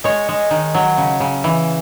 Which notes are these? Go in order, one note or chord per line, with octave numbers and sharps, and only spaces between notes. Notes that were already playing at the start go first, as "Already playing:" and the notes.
G#3 C#5
G#3
D#3
F#3
C#3
C#3
E3